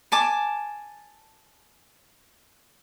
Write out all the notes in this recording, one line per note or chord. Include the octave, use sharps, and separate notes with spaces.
G#5 A5 D6